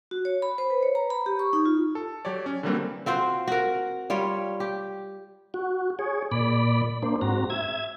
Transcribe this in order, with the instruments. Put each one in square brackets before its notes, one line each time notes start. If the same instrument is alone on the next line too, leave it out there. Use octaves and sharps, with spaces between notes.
[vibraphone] F#4
C#5
B5
C5
B4
C#5
A#5
B5
G4
C#6
D#4
F4
[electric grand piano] A4
F#3 G4 C#5 D5
C#4
D3 E3 F#3 G3 A#3 C4
[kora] C4 F4 F#4 C5
F#4 A#4
G3 F4 C#5
G4
[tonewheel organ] F#4
G#4 C#5
A#2 D5 B5
A#3 D4 C5
G#2 C4 F#4 A#5
E5 G#6